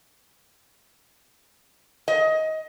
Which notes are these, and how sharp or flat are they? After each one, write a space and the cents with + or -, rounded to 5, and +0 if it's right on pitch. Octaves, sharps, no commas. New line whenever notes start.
D#5 +20